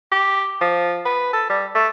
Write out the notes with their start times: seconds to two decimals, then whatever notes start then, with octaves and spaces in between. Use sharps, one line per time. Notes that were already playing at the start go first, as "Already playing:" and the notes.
0.12 G4
0.61 F3
1.05 B4
1.33 A4
1.49 G3
1.75 A3